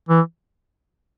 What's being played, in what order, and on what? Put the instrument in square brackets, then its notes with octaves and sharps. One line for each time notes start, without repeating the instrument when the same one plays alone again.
[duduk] E3